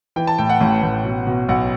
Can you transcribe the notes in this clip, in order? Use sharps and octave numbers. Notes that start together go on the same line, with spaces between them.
E3 G5
A5
A2 G5
F#5
A1
A1
B2
B2
B1 F#5